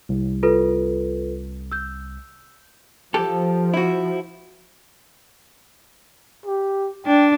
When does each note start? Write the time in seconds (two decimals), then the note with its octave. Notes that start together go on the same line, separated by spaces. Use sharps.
0.09 C2
0.43 F4 A4 B4
1.72 E6 G6
3.14 F3 G4 A4
3.74 E4 F#4
6.46 G4
7.06 D4 G5